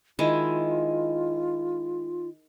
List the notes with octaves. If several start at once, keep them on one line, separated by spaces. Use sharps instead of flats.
D#3 G#3 E4 F4